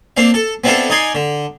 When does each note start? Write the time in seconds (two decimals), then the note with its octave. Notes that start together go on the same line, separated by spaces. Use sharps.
0.17 A#3 C4 D4 F5
0.34 A4
0.64 B3 C4 D4 E4 F4 A4
0.90 D#4 D5 D#5 G#5 C6
1.15 D3